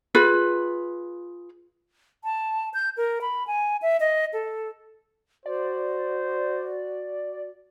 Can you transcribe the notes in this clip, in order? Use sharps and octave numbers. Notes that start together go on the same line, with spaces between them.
F4 G#4 B4
A5
G6
A#4
B5
G#5
E5
D#5
A4
F#4 C5 D5